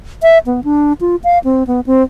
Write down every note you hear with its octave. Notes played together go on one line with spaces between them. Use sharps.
E5
B3
D4
F4
F5
C4
B3
C4